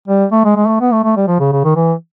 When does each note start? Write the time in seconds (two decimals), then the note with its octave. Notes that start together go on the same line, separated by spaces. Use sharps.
0.08 G3
0.32 A3
0.45 G#3
0.56 G#3
0.68 A3
0.81 B3
0.93 A3
1.04 A3
1.16 G3
1.28 F3
1.40 C#3
1.52 C#3
1.65 D#3
1.76 E3